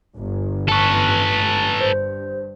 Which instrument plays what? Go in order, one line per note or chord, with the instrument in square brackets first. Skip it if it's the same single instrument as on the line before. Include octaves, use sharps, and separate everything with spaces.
[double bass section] G1
[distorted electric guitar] A4 B4 [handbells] A5 C#6
[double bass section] G2 [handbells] C5